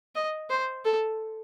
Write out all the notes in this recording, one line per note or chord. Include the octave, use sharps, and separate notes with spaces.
D#5
C5
A4